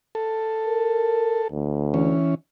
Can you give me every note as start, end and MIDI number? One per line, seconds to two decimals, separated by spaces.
0.15 1.48 69
0.66 1.42 70
1.52 2.18 38
1.94 2.35 52
1.94 2.35 61